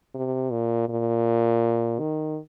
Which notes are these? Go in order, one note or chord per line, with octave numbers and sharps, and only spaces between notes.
C3
A#2
A#2
D#3